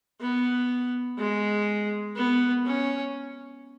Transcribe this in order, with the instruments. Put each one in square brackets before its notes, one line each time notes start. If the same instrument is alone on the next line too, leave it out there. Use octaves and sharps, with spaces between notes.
[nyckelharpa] B3
G#3
B3
C#4